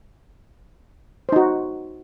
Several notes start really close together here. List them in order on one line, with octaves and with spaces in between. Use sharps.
C5 D#4 F#4